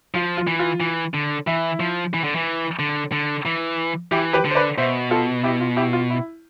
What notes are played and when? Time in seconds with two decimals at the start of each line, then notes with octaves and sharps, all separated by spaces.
0.15 F3 F4
0.37 F4
0.47 E3
0.59 F4
0.80 E3
1.14 D3
1.47 E3 E4
1.80 F3
2.14 E3
2.24 D3
2.35 E3
2.79 D3
3.12 D3
3.45 E3
4.11 E3 E4 G4
4.33 G4 B4
4.45 D3
4.50 C5
4.55 B4 D5
4.78 B2 C5 E5
5.11 F4 A4
5.43 E4 G4
5.61 F4
5.77 E4 G4
5.93 F4
6.10 E4